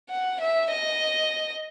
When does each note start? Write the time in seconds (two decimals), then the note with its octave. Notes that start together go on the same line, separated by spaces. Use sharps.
0.10 F#5
0.41 E5
0.71 D#5